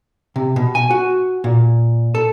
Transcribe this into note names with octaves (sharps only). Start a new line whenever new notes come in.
C3
B2
G#5
F#4
A#2
A4